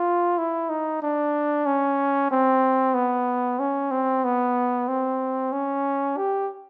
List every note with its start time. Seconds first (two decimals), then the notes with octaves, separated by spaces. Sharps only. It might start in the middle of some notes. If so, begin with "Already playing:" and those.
Already playing: F4
0.38 E4
0.70 D#4
1.03 D4
1.66 C#4
2.31 C4
2.95 B3
3.59 C#4
3.91 C4
4.24 B3
4.88 C4
5.52 C#4
6.17 G4